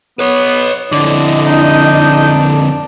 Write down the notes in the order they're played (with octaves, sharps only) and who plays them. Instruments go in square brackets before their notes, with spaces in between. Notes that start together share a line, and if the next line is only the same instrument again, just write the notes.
[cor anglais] B3 [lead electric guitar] B4 C#5
[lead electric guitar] F2 D3 [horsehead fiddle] E4 D#5 [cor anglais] D5
[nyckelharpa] D4 [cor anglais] D#4